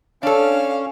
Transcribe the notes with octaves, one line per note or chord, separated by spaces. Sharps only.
C#4 D4 A4 F5